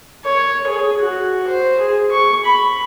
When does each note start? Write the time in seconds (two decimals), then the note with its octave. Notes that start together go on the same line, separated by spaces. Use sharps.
0.25 C#5
0.67 G#4
0.99 F#4
1.48 C5
1.79 G#4
2.11 C#6
2.45 B5